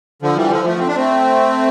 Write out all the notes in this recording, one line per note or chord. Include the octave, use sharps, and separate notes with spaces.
D3 F3
E3 G3
D3 F3
F3 A3
C4
D4
A3 C4